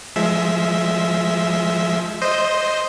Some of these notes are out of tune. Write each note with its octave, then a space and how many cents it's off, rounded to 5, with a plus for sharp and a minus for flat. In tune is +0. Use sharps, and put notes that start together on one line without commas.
F3 +0 G#3 +20 E5 +0
C5 +0 D#5 +0